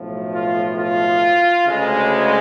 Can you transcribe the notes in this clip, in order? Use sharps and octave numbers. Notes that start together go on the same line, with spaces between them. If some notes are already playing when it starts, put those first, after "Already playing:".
Already playing: B1 A2 F3
F4
F4
D2 C#3 G#3
G#4